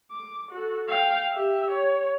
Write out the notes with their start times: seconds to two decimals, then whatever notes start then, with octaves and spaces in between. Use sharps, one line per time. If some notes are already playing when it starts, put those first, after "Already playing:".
0.11 D6
0.52 F#4 A4
0.88 F5 G5
1.33 G4 E5
1.71 C#5